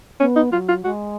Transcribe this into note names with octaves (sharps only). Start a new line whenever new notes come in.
B3 C#4
D#4
F#3 F4
F4
G#3 F#4